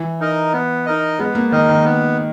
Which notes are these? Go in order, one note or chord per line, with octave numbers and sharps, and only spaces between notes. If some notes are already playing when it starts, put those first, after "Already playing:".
Already playing: E3
D#4 A#4 D#5
B3
D#4 A#4 D#5
G#3 B3
A#3
D#3 D#4 A#4 D#5
D#3
B3